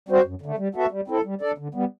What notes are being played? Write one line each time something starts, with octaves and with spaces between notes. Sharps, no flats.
G3 C4 F#4 C5
F#2
D3 A3
G3
B3 F#4 A4 E5
G3
C4 E4 A4
G3
D4 A4 D5
D3
G3 B3